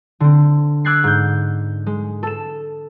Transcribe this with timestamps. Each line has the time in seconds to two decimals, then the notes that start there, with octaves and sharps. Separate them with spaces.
0.20 D3 C4
0.85 D6 E6 F#6 G#6 A6 C7
1.04 G#2 G6
1.86 G#3
2.23 A4 E7